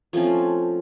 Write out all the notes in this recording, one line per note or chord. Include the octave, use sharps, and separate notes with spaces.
F3 A3 C4 C#4